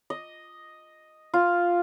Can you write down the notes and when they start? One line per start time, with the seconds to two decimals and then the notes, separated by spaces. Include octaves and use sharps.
0.10 D#5
1.34 F4